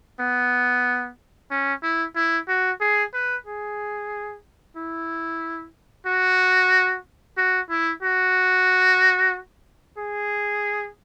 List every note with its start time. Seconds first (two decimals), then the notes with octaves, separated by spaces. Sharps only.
0.20 B3
1.50 C#4
1.83 E4
2.16 E4
2.48 F#4
2.81 G#4
3.14 B4
3.46 G#4
4.76 E4
6.06 F#4
7.37 F#4
7.70 E4
8.03 F#4
9.98 G#4